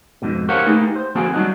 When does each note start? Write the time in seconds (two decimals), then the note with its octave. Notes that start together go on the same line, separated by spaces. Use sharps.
0.22 F2 G#2 B2
0.49 G4 A#4 C5 C#5 F5 F#5
0.66 A3 A#3 D#4 G4 G#4 B4
0.96 C5
1.15 D3 F3 A#3 C4 F#4 G#4
1.33 F#3 G3 D4 D#4 F#4